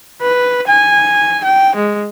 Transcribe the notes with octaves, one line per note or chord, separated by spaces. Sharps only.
B4
G#5
G5
G#3